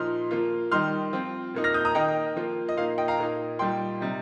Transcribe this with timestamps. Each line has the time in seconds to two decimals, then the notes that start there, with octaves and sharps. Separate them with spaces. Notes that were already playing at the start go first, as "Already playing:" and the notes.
Already playing: A#2 F3 D#4 C6 F6
0.31 F3 A#3 F4
0.71 D#3 G3 D#4 C6 F6
1.13 F3 C4 F4
1.54 A#2 A#3 D#4
1.64 F6 A#6
1.74 D#6 G6
1.85 A#5 D#6
1.95 D#3 A#3 D#4 D#5 G5
2.36 F3 A#3 F4
2.69 D#5
2.77 A#2 A#3 D#4 F5
2.98 D#5 G5
3.08 F5 A#5
3.18 A#2 A#3 D#4
3.59 A#2 G3 D#4 G5 C6
4.01 C3 G3 D#4